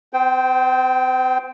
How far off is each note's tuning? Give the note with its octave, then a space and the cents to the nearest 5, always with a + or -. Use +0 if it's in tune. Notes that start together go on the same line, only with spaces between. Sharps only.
C4 -40 C5 -10 G5 +0